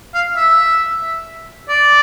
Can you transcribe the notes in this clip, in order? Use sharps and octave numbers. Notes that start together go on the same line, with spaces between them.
F5
E5
D5